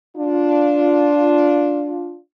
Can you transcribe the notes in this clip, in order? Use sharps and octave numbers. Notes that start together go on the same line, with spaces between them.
D4 F4